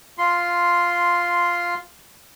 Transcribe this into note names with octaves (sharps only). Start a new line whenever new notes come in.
F4 C6